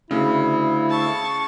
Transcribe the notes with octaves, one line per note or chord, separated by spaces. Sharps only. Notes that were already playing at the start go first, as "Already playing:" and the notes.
D2 C#3 E4
A5 C#6